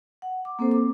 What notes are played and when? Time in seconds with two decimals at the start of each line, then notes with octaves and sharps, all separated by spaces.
0.22 F#5
0.45 D6
0.59 A#3 C4 A4 C5
0.71 D6